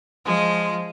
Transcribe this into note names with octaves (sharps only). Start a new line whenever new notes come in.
F3 G#3